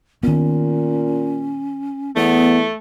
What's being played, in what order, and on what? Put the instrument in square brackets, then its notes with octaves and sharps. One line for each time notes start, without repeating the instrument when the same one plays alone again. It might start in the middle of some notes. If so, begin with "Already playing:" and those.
[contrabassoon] A#2 [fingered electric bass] D#3 B3 [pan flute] C#4
[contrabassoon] E2 [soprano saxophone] A3 [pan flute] B3